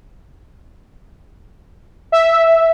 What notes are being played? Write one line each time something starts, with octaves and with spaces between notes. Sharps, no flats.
E5